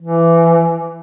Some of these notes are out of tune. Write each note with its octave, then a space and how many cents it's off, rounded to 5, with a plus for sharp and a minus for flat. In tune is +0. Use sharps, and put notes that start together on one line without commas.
E3 +20